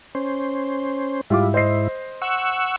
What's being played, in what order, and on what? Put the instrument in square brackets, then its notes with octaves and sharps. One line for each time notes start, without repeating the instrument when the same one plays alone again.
[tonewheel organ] C#4 C5
[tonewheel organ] G#2 E4 [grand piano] G3 F4 D6
[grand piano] C5 D#5 C7
[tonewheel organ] F#5 C#6 E6